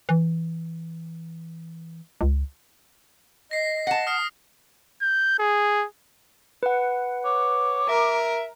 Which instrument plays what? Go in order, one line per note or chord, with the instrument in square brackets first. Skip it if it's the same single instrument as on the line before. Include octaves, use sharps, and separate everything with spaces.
[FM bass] E3
C#2
[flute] D#5 [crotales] A#6 C7
[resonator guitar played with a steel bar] F#5 A5 [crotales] A#6
[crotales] D#6 F6 C7
[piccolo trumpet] G6
G#4
[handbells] B4 F#5
[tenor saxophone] C#5 [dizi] D6
[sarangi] A#4 [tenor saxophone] E5